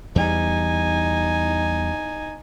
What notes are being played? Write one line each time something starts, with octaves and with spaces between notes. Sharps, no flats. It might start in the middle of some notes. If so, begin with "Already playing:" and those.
E2 G3 D#4 G#5